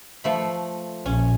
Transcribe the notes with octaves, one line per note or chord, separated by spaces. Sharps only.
F3 A3 B5
A#1 C#4